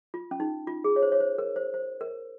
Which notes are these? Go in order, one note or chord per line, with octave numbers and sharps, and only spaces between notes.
F4
C#4
D#4
F4
G#4
C#5
C5
C#5
C5
A#4
C5
C5
A#4